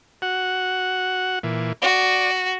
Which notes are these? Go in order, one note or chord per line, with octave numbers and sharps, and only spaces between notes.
F#4 F#5
A#2 E3
F#4 D5